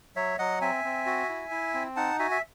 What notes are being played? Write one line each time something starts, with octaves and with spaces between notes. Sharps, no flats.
F#3 C#5 E5
F#3 D#5 F#5
C4 E5 G#5
C4
F#4
E4
E4
C4
D#4 F#5 A5
F#4 E5 G#5
E5